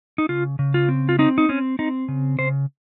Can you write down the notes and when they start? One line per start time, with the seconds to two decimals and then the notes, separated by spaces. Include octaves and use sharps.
0.18 D#4
0.29 C#3 F4
0.59 C#3
0.74 F4
0.89 C4
1.09 F4
1.19 C4 D#4
1.38 D#4
1.49 C4 C#4
1.79 C4 D#4
2.08 C#3
2.39 C#3 C5